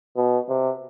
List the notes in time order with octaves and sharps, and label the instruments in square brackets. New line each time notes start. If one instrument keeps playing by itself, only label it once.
[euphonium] B2
C3